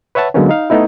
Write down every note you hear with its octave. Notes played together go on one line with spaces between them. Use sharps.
B4 C#5 E5 F#5 A5
D3 F#3 G#3 A#3 B3 C#4
D#4 F5
A3 B3 D#4 E4